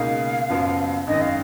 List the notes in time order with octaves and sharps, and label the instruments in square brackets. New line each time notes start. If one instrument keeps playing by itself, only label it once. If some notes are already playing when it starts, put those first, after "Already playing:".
Already playing: [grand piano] C#2 B2 A#3 D#4 G#4 [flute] F5
[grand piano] F#1 F#2 F3 B3 F#4
[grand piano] G#1 F#2 D#3 [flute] D#5
[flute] F5